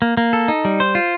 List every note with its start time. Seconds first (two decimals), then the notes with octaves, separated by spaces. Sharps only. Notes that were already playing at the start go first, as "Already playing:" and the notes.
0.02 A#3
0.17 A#3
0.33 A4
0.48 D#4
0.65 G3
0.80 C5
0.95 F4